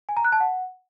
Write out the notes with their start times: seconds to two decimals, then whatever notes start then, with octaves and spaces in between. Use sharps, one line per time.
0.09 G#5
0.17 A#5
0.24 F#6
0.32 A5
0.40 F#5